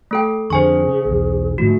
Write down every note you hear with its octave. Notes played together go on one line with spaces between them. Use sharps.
A3 A4 G5
F2 D3 G#4 C5 G#5 C#6
C#3
B1 E2
G#2 D3 F3 A3 F#4